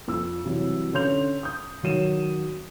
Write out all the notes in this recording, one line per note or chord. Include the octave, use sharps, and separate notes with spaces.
F2 E6
C3 E3 F#3 G3
D3 C#4 C#5 C6 G6 F7
D#6 G6
D#3 F#3 D#7 E7